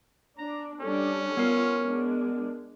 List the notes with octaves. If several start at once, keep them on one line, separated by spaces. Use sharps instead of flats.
D4 A#5
G3 C#4 D4 A4
B3 F4 A#4
G#3 D4